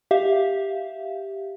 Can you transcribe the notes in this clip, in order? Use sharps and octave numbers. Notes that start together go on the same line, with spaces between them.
G4 E5 F5